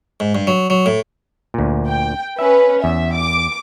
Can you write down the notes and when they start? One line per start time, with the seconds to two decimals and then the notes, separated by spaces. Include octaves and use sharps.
0.20 G#2
0.35 G2
0.47 F#3
0.70 F#3
0.86 A2
1.54 D2 A#2
1.88 G5
2.39 C#4 B4 E5
2.84 E2 E5
3.17 D6